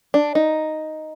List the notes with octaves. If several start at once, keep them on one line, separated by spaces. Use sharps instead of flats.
D4
D#4